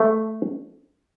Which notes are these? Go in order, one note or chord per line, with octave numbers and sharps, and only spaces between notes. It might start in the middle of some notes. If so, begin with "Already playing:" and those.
Already playing: A3